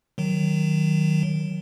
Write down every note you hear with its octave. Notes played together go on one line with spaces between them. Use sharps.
D#3 F#3